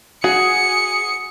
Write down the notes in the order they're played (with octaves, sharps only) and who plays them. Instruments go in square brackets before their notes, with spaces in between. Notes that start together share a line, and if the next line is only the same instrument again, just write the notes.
[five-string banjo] F#4 [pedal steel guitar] G#4 [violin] C#7